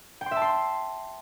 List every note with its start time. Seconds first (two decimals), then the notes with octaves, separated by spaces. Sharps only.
0.21 G5
0.26 C6
0.31 E5
0.36 A5
0.42 C6